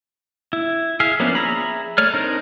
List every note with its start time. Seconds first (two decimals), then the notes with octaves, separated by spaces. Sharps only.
0.53 E4
1.00 G#4 E5 F5
1.20 F3 A#3 B3 C#4 D4
1.35 G#4 E5 A#5 B5
1.98 A3 C#5 D5 F6
2.14 C4 D4 D#4 A#4